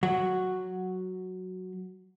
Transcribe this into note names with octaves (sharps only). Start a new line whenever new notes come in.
F#3 F#4